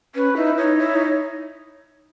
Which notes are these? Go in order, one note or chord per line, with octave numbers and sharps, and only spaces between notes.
C#4 B4
D#4 E4
D#4 C#5
E4 C#5
D#4